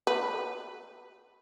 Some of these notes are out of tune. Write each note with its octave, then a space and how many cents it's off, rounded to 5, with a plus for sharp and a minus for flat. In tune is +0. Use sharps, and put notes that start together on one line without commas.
B4 -5